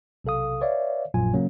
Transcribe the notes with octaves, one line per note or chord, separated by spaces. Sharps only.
B1 C3 A4 F5 D#6
B4 C#5 D5 E5 F5
A#1 F#2 A#2 F#3 F4 G#5
C#3 F#3 A#3 C#4